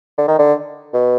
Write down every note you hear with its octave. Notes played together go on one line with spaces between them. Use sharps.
D3
D#3
D3
B2